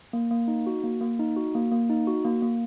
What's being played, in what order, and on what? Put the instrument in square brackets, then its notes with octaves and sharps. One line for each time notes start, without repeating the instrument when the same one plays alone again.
[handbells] A#3
A#3
D#4
F#4
A#3
A#3
D#4
F#4
A#3
A#3
D#4
F#4
A#3
A#3